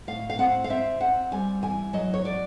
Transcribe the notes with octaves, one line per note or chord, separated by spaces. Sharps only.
A2 F5
F5
C4 F#5
F5
C4 E5
C4 F#5
G3 G#5
E3 G#5
F#3 D#5
C#5
F#3 D5